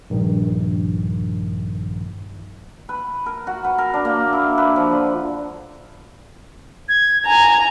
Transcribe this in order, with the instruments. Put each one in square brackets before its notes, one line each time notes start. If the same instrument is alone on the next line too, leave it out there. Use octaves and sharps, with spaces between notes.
[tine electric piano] A#1 G2 D#3
[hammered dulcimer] B4
A#4
F#4
B4
A#4
D4
A#3
E4
B4
F3
D3
[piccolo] G#6
[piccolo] G#5 [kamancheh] A#5